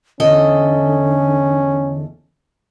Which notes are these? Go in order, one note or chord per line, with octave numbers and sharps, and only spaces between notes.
E2 D3 C#4 A4 D#5